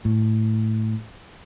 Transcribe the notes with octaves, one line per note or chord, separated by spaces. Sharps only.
A2